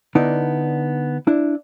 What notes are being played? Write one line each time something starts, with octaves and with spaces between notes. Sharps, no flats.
D3 B3 D#4 E4 D5
D4 E4